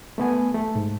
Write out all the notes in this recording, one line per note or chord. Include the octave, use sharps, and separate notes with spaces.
A3 B3 G#5
A3
G#2